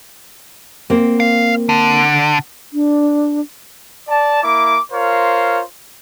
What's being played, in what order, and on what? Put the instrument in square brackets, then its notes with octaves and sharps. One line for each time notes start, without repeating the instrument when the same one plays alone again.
[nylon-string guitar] A#3 C4
[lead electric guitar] F5
D3
[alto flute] D4
[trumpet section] D5 A5
A#3 E4 D6
F4 A#4 C5 C#5 F5